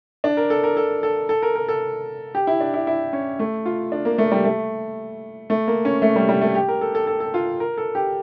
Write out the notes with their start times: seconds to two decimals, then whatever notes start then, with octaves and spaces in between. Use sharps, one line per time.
0.24 D4
0.37 A#4
0.50 A4
0.64 A#4
0.77 A4
1.03 A4
1.29 A4
1.42 A#4
1.55 A#4
1.69 A4
2.35 G4
2.47 E4
2.60 D4
2.74 E4
2.87 E4
3.13 C#4
3.39 A3
3.66 F4
3.92 D4
4.05 A#3
4.18 A3
4.32 G3
4.45 A3
5.50 A3
5.68 A#3
5.85 C#4
6.02 A3
6.16 G3
6.29 G3
6.41 A3
6.55 G4
6.68 A#4
6.81 A4
6.95 A4
7.07 A4
7.20 A4
7.34 F4
7.60 A#4
7.78 A4
7.95 G4